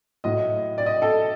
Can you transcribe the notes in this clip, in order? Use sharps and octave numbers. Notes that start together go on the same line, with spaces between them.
A2 F#3 D#5
D5
D#5
A4